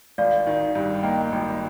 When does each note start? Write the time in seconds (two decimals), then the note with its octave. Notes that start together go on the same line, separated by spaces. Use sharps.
0.18 G#1 D5 F5
0.47 D#3
0.75 G2
1.03 A#3 D#5 G5
1.32 G#1